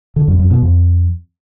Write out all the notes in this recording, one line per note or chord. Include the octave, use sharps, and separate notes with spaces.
D3
F#2
F#2
B2
F2